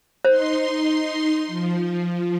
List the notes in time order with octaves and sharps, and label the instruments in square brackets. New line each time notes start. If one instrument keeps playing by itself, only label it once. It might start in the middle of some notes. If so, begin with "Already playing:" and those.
[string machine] D#4 C6 [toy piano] C5
[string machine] F3